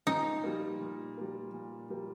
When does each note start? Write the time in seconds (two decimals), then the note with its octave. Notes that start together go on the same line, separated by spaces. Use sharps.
0.07 A#2 D#4
0.44 G3 A#3
0.81 A#2
1.17 G3 A#3
1.54 A#2
1.90 G3 A#3